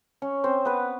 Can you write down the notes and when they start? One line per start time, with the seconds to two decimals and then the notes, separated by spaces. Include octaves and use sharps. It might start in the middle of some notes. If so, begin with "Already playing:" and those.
0.22 C#4 C#5
0.44 C4 C5
0.65 B3 B4